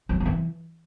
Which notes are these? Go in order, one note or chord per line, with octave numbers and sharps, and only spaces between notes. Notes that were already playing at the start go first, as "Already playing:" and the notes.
F#3
D#3
E3